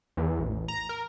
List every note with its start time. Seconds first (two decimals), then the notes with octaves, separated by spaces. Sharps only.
0.17 E2
0.39 A1
0.68 A#5
0.89 A#4